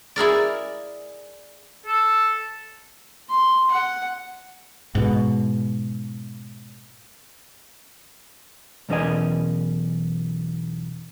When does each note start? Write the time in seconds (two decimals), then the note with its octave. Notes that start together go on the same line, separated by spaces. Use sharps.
0.16 E4 G#4 A#4 D5
1.86 A4
3.29 C6
3.71 F#5
4.95 G#2 B2
8.89 B1 E2 C#4 A#4 D#5 G#5